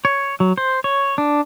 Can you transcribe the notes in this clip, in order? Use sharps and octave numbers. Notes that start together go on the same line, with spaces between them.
C#5
F#3
C5
C#5
D4